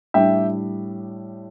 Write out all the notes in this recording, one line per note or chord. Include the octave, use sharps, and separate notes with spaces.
A2 G3 D4 E5 G5